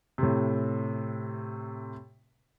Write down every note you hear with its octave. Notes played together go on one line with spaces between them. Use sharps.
A2 C3